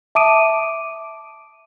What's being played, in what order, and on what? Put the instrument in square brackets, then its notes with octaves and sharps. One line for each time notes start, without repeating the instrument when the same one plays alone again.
[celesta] E5 A5 D6 D#6 D7 D#7